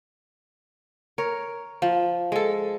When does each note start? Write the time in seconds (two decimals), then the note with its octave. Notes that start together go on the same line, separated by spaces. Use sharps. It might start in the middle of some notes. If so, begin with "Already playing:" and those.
1.18 A#4 C#5
1.82 F3
2.32 G#3 A4